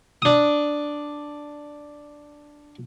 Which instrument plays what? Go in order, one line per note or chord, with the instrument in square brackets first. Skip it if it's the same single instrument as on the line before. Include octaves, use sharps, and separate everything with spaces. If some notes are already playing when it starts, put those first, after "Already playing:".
[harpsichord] D4 D#6